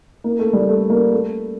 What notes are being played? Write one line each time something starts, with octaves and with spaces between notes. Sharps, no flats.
A#3
A3
G3
A3
A#3
A3